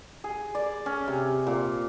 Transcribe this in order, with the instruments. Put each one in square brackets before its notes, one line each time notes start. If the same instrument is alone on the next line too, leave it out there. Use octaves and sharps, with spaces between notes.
[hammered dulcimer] G#4
D5
C#4
C3
A#2